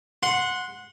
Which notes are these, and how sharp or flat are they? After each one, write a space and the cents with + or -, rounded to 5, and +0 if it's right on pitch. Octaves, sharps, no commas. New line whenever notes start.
F#5 -15 C6 +0